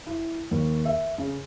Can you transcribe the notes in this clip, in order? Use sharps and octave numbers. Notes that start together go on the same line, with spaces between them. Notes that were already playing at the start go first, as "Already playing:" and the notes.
E4
D#2
E5
C#3